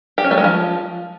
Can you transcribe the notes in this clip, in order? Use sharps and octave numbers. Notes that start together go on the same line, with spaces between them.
G4
C#4
A3
G#3
F3